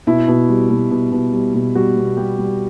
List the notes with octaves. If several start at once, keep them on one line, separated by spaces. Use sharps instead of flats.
B2 E4
B2
G3
B2
B2
B2
G3
B2
G3 F#4
B2
G3 G4
G3